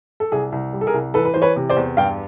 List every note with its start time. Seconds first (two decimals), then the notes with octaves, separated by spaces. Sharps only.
0.20 A4
0.32 C2 G#4
0.52 C2
0.73 G3
0.81 A4
0.87 G#4 A#4
0.94 C2
1.14 E3 A4 B4
1.25 B4
1.34 E3 C5
1.42 B4 C#5
1.56 C3
1.70 C5 D5
1.77 E2
1.97 G2 F5 G5